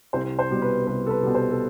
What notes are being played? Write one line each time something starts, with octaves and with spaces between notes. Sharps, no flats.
C2 C5
C5
B2 G3
B4
C2 B4
A4
B4
B2 G3
C5
A4